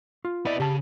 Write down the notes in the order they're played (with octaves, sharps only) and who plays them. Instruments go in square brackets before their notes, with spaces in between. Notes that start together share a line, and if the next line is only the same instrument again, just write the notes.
[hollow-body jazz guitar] F4
[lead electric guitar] B3 D#5 [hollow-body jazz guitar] E4 D5
[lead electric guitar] C#3 [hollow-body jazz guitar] G4 A5